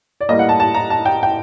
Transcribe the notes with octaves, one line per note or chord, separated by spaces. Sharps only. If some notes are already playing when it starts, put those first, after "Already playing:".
D5
A2 G3 A#3 D#5
F#5
A5
A5
A#5
A5
G5
G5